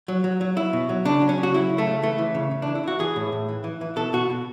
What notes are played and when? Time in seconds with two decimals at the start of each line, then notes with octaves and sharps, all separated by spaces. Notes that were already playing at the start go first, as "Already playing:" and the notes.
0.08 F#3
0.24 F#3
0.41 F#3
0.56 F#3 E4
0.73 B2
0.89 F#3
1.05 C#3 D4
1.22 F#3
1.29 C#4
1.38 C#3
1.43 F#4
1.54 F#3 E4
1.69 C#3
1.78 A3
1.87 C#3
2.03 E3 A3
2.18 E3
2.35 C#3
2.51 C#3
2.62 E3 D4
2.75 E4
2.84 E3 F#4
2.99 E3 G#4
3.16 A2
3.32 A2
3.48 E3
3.64 E3
3.81 E3
3.96 B2 A4
4.13 B2 F#4
4.30 B2